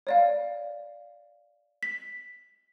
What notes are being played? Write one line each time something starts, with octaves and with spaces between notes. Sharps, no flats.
C#5 D5 F5
B6